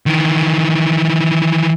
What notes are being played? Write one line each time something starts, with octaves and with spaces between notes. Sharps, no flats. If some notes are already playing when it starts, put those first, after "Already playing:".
D#3 E3